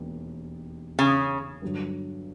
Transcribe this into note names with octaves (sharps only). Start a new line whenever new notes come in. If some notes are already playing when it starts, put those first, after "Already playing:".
Already playing: E1 D#2
C#3
G2 D3 F#3